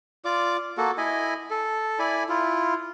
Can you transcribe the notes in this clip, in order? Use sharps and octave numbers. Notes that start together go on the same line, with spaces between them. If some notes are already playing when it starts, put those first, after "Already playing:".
F4 D5 D6
A#3 F#4 A4
E4 D#5 G#5 B5
A4
E4 D5 G#5 B5
E4 F4